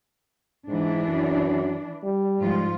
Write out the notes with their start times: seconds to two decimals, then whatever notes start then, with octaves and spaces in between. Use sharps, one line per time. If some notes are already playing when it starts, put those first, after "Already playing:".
0.68 G#2 E3 D4
1.08 F#2
2.03 G3
2.38 G#2 F3 F4